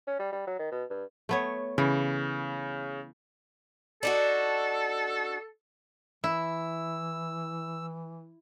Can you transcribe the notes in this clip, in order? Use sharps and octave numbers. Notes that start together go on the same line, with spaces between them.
C#4
G3
G3
F#3
D#3
B2
G2
A3 B3 C#5
C#3 E3
D4 D#4 F#4 A4
E3 E4 E6